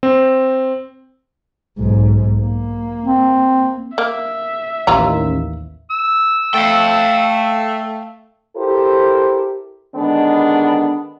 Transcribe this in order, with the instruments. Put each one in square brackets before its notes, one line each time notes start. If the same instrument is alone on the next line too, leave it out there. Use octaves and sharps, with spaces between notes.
[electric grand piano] C4
[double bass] B1 G#2
A#3
[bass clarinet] C4
[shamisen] A#3 [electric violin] E5
[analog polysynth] A1 D#2 [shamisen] E3 F4 A#5
[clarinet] E6
[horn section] A3 [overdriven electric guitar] F5 G5
[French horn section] E4 G4 A4 A#4 C5
D3 D#3 G#3 B3 D4